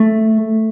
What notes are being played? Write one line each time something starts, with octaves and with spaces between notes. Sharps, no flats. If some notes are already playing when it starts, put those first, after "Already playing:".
Already playing: A3